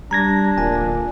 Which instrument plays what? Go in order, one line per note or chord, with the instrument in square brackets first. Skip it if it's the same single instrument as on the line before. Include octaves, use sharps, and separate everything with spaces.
[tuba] G3 [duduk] D4 [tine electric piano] A#5 G#6 A#6
[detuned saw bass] D1 [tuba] A#2 [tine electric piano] G#5